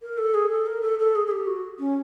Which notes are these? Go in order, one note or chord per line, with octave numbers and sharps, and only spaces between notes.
A#4
A4
G#4
A4
A#4
A4
A4
G#4
G#4
G4
F#4
C#4